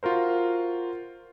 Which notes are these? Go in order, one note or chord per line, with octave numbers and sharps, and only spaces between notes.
F4 F#4 A#4 C5